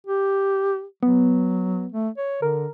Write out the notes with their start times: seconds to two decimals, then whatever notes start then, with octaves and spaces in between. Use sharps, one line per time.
0.07 G4
1.03 F#3 B3
1.92 A3
2.18 C#5
2.42 D3 A#4